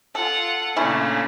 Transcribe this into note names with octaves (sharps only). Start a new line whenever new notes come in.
F4 A4 F#5
A#2 C#3 A3 C#4 D4 E4